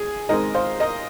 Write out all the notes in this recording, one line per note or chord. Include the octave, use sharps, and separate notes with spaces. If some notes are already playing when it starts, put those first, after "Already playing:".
Already playing: G#4
G#2 D#3 G#3 C4 A#4 D#5
C5 F5
A#4 D#5